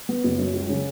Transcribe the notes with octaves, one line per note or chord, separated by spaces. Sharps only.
B3
F#1
F#2
C#2
C#3